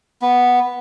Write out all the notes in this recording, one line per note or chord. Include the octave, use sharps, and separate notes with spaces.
B3